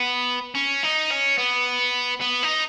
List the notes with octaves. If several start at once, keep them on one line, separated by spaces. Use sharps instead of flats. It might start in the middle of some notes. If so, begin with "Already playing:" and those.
Already playing: B3
C#4
D#4
C#4
B3
B3
D#4